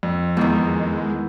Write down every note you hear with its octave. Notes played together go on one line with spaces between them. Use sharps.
F2
E2 D#3 G#3